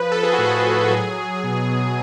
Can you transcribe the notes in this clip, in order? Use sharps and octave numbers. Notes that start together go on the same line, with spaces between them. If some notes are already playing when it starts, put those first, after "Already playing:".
Already playing: F3 B4
F3 A4
G#4
F#4
A2
G#4
A2
F#3 G#4
F#3
B2
B2